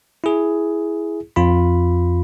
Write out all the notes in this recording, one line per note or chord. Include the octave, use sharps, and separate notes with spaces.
E4 G#4
F2 F4 B5